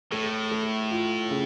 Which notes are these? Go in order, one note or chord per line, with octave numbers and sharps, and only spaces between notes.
A2 A3
A3
F4
C#3